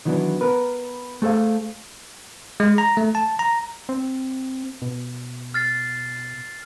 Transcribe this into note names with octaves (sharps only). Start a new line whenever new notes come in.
D#3 E3 F#3 B3 D4
B3 A#4 B4
A3 G#4 A4 C5 F5
G#3
A#5
A3
A5
A#5
C4
B2
F6 A6 C7